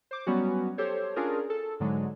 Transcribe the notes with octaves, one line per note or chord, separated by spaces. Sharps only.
C5 D6
F#3 G3 B3 C#4 F#4
G4 A4 C5 C#5
C#4 D4 F4 G#4 A#4
A4
G#2 D3 F#3 G#3